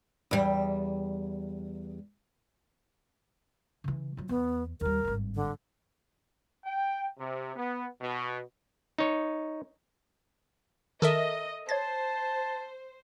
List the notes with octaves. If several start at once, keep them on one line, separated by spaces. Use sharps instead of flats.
E2 G3
C#3 E3
F3 F#3
E2 B3
D#2 G3 A#4
G#1 G2
D3
G5
C3
B3
B2
D#4 C#5
D#3 A4 A#4 D#5 E5
C5 C#5 A5 G#6 A6